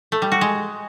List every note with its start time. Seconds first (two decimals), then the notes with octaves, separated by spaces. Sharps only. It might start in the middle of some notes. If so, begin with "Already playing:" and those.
0.12 A3
0.22 G3
0.32 F#4
0.41 G#3